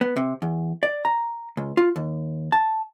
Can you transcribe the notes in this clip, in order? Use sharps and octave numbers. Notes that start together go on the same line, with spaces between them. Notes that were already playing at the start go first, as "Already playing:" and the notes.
B3
C3
E2
D5
A#5
C#2
F4
D#2
A5